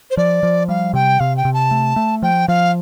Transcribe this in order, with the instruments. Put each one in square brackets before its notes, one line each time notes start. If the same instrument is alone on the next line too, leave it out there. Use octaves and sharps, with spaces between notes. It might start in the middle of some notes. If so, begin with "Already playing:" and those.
[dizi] C5
[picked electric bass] F3 [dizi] D5
[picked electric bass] F3
[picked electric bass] G3 [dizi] F5
[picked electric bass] C3 [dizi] G5
[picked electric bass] C3 [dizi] F5
[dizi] G5
[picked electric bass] C3
[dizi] A5
[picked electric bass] A3
A3
[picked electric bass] F3 [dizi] G5
[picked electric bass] F3 [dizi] F5